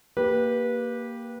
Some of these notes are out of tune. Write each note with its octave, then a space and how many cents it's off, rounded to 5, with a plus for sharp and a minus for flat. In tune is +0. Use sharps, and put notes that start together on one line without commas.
A#3 +0 G4 +0 B4 -20